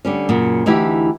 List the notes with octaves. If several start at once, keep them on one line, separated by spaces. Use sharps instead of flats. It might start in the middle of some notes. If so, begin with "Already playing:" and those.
D3 G3 C#4
F#2 A#2 C#3
D2 E3 D#4 E4 G4